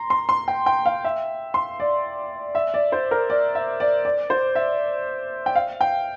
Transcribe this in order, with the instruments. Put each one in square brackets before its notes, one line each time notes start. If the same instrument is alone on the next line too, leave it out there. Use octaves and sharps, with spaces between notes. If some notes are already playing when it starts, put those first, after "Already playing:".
Already playing: [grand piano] A#5 C6
C6
C6
G5
G5
F5
E5
C6
D5
E5
D5
C5
A#4
D5
E5
D5
D5
C5
E5
G5
F5
G5